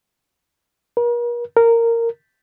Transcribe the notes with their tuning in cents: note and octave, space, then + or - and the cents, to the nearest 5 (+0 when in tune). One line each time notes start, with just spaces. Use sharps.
A#4 +45
A#4 -10